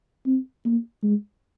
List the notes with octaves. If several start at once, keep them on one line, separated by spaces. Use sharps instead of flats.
C4
A#3
G#3